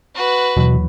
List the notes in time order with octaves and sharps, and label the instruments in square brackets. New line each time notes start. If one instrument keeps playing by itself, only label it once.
[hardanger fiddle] F#4 B4
[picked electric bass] D#2 E3 F#3 [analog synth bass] B2